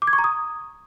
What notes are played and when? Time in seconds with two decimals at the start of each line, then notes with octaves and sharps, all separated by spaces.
0.02 D6
0.07 G#6
0.13 C#6
0.19 A#5
0.24 D#6